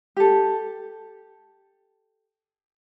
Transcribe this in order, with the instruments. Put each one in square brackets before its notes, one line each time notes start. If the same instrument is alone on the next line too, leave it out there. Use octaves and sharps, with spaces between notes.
[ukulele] G4 A4